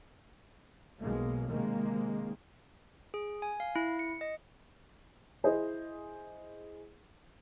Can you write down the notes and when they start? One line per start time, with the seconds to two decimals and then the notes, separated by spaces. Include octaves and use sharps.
0.99 B1 B2 G#3 A#3
1.48 C3 D#3 G#3 A#3
3.14 G#4
3.42 G#5
3.60 F5
3.76 E4
3.99 C#7
4.21 D#5
5.44 E4 G#4 C5 D#5